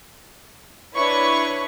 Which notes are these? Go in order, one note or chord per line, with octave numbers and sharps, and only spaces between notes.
D4 E4 B4 C#5 B5 C#6